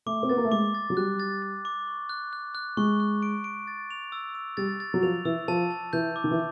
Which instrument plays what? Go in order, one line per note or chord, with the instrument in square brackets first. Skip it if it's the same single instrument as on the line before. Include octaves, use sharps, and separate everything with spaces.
[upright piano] A3 [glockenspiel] D6
[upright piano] C4
[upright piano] B3 [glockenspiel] A6
[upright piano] A#3
A3
[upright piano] G#3 [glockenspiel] D6
[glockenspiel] A6
[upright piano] F#3
[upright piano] G3 [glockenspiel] F#6
[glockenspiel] A6
A6
D6
C#6
F#6
F#6
F#6
[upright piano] G#3 [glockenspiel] C#6
[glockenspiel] F#6
D7
D7
A6
F7
E6
E6
[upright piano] G3 [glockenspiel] A6
[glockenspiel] A6
[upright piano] F#3
[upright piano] F3 [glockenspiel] F7
[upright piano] E3 [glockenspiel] E6
[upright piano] F3 [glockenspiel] A5
[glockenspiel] A5
[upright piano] E3 [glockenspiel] G6
[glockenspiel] D6
[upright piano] D#3
E3